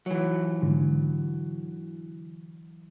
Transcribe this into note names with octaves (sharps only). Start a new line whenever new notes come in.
E3 F#3
G#2 D3